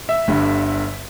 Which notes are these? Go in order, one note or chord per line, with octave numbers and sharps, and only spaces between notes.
E5
G1 G2 D3